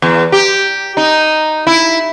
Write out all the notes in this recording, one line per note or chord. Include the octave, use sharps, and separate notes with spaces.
E2
G4
D#4
E4